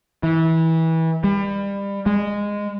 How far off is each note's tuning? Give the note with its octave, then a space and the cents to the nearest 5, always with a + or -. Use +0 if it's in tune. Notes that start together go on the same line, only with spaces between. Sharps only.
E3 -25
G3 +30
G#3 -15